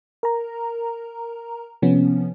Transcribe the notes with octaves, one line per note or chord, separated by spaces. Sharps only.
A#4 A#5
C3 F3 B3 C#4